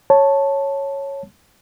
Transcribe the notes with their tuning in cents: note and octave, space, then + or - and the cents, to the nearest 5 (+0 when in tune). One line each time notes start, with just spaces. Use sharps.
C#5 -5 A5 +0